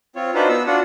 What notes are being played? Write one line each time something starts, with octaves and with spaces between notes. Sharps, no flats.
C4 F4 C#5
D4 D#4 F4 F#4 B4 C5
B3 E6
D4 F4 F#4 F#5